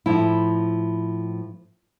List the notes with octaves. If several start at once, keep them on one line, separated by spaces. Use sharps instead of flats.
A2 F3 E4